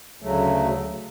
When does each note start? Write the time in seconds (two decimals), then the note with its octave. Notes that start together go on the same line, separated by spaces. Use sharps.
0.22 D2 C#3 F#3 A3